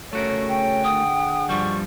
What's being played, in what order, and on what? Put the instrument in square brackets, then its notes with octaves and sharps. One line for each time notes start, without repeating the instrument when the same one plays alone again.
[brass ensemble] C#3 G#4 C#5 [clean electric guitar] A3 F#4 A#4
[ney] G5
[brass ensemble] D3 G#4 F#5 [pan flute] D#6
[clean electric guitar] G2 F3 G3 [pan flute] C#6